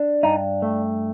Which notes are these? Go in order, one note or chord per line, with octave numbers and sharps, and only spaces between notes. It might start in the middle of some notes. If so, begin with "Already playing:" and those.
Already playing: D4
G2 D#4
A3